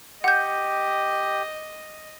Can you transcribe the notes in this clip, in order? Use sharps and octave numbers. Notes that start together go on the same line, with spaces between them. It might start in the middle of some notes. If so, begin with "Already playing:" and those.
G4 D#5 F#5 G6